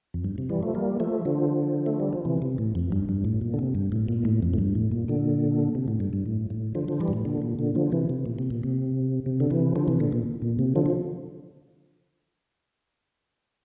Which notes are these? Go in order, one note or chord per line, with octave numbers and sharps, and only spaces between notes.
F2
G2
C3
E3 G3
F3 A3
G3 A#3
F3 A3
D3 F3
A3
G3
F3
C3 E3
C3
A2
F2
G2
G2
A2
A#2
D3
C3
G2
A2
A#2
A2
F2
A2
G2
A2
A#2
A#2 D3
C3
A2
G2
G2
A2
A2
D3 F3
D3 F3
E3 G3
G2
A2
A#2 D3
A#2
A#2 D3
D3 F3
C3 E3
C3
A#2
C3
A#2
C3
C3
D3
C3 E3
D3 F3
C3 E3
A#2 D3
A#2
A#2
C3
D3 F3
F3